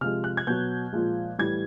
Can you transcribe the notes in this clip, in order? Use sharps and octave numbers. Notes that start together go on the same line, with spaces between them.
C3 F3 G#3 F6
F#6
G#6
B2 F#3 G6
A#2 F3 G#3
A2 E3 G3 G#6